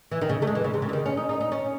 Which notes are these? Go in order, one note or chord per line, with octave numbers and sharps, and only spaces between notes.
E3
D#3
C#3
A3
G#3
E3
C#3
C3
C#3
E3
D#3
C#4
D#4
D#4
D#4
C#4